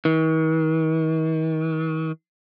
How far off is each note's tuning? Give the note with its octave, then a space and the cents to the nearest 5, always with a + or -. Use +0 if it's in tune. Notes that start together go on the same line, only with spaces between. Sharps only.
D#3 +45